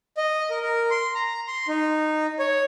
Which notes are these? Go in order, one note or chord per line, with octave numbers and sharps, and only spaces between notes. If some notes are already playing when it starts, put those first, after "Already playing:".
D#5
A#4
A#4
C6
A#5
C6
D#4
C#5